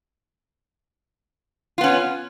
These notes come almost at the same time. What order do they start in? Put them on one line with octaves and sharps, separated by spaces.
F4 B3 C#4